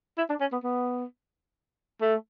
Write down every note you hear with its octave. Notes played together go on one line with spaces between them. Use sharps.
E4
D4
C#4
B3
B3
A3